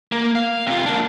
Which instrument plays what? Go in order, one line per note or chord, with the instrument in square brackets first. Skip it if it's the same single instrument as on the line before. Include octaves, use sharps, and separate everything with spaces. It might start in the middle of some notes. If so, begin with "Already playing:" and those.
[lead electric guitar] A#3
F5
C3 F4
A#3 D4